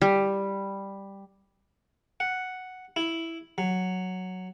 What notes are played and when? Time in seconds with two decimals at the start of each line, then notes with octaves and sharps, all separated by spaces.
0.01 G3
2.20 F#5
2.96 E4
3.58 F#3